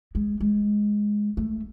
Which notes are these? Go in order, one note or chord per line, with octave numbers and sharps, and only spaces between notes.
G#3
G#3
A3